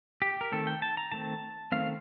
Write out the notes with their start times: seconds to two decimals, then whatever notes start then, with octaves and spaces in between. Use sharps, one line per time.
0.22 G4
0.41 A#4
0.52 D#3 A3 C4 A4
0.67 G5
0.82 A5
0.97 A#5
1.12 D#3 A3 C4 A5
1.72 D#3 A3 C4 F5